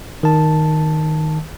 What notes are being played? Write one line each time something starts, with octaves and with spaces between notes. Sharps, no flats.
D#3 A5